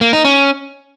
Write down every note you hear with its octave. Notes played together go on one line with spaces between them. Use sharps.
A#3
D#4
C#4